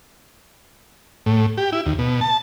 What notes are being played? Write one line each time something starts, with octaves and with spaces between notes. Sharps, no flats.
A2
G4
E4
D#2
B2
A5